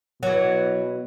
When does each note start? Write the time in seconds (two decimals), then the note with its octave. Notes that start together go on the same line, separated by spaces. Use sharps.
0.23 B2 E3 F#3